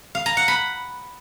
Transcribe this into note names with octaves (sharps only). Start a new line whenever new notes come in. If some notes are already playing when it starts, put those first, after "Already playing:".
F5
A#5
F#5
B5